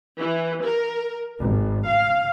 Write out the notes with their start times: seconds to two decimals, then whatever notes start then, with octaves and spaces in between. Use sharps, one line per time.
0.19 E3
0.64 A#4
1.41 G#1
1.86 F5